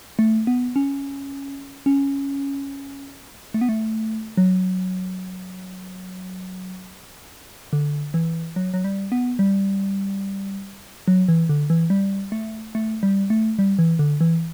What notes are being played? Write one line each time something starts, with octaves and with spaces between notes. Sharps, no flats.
A3
B3
C#4
C#4
A3
B3
A3
F#3
D3
E3
F#3
F#3
G3
B3
G3
F#3
E3
D3
E3
G3
A3
A3
G3
A3
G3
E3
D3
E3